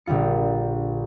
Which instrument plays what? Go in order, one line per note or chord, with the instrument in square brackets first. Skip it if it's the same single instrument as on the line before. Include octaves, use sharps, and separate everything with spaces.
[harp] A#1 D3 G3 F4 C#7